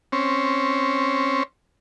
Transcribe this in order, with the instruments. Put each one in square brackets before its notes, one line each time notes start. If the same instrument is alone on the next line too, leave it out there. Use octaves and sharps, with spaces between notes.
[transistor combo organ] C4 C#4